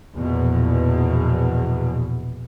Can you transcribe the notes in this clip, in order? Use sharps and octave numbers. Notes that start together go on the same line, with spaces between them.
A#1 E2 B2